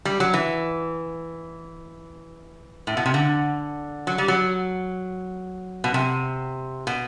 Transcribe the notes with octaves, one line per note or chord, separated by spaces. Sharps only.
G3
F#3
E3
A2
B2
C3
D3
F#3
G3
F#3
B2
C3
B2